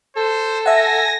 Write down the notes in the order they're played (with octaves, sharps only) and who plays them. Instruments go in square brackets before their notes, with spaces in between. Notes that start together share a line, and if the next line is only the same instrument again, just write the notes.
[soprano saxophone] A4 [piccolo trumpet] C5
[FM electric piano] E5 F#5 [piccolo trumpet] G#5 [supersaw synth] A#6